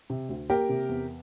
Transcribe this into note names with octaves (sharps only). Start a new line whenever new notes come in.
C3
D2
A#3 G4 A#4
C3
E2